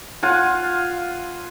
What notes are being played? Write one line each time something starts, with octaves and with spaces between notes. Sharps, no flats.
F4 F#5 G#5